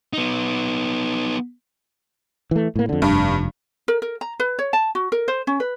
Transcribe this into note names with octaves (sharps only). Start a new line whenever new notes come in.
B3 D#4
E3 A3
A2 A#3
F2 D3
F1 G2
A#4
A#4
A#5
B4
C#5
A5
F#4
A#4
C5
C#4
B4